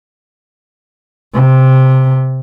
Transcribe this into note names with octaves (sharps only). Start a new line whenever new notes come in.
C3